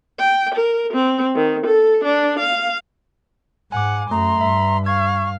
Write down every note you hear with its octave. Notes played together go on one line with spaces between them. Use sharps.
G5
A#4
C4
D#3
A4
D4
F5
G#2 F#5 G#5 D6
F#2 A3 A#5 C6
G2 E5
F5 C#6 G#6